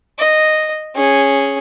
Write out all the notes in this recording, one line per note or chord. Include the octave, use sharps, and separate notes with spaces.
D#5
C#4 G#4